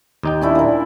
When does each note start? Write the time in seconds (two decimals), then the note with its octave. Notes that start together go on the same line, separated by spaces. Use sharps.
0.23 D#2 D#4 G5
0.42 C#4 D4 E4
0.55 A#2 A#4